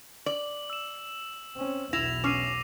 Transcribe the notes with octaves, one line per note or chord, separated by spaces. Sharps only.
D5 F#7
E6 E7
C4 C#4
B1 E2 E4 A#6 E7 F7
C#4 D6 C7 D#7